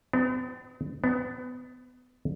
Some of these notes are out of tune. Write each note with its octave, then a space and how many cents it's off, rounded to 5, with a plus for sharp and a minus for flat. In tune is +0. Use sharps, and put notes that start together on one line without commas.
B3 +45
B3 +25